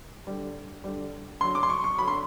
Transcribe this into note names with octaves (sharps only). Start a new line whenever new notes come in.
D3 G3
D3 G3
D3 F#3 C6
D6
C6
C#6
C#6
D3 F#3 B5
C6